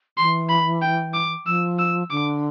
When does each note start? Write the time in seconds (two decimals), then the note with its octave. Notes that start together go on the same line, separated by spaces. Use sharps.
0.18 E3 C6
0.49 B5
0.81 G5
1.14 D6
1.46 F3 E6
1.79 E6
2.10 D3 D6